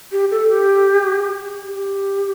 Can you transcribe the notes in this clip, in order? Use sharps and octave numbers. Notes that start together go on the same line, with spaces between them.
G4
A4
G4
G4